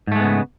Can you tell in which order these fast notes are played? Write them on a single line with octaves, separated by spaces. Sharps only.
G#2 A3 G#3 B3 C#3